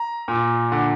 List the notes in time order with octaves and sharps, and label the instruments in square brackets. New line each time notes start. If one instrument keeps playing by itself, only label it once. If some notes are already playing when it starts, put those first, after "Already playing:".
Already playing: [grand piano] A#5
A#2
D3